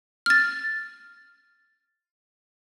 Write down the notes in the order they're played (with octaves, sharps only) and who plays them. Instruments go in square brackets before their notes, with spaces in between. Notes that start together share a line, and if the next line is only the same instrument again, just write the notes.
[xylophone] F6 A6